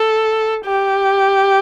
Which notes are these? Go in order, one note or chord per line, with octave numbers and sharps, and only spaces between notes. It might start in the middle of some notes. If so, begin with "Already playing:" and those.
Already playing: A4
G4